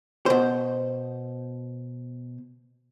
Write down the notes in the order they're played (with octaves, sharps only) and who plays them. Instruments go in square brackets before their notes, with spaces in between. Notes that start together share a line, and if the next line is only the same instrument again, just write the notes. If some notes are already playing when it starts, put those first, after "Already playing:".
[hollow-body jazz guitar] B2 C5